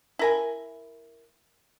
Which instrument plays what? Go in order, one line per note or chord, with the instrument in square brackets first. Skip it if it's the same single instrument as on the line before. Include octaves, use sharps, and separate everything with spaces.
[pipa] E4 A#4 G#5